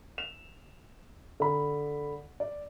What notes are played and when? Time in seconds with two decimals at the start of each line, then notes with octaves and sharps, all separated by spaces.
0.18 E7 F7
1.40 D3 B5
2.40 D5